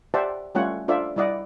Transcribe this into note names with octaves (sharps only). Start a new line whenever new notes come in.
G4 C5 D5 E5 F#5 A5
G3 A3 C#4 F4 C#5 F#5
D4 F4 A4 C5 D5 E5
G3 E4 D5 D#5 F#5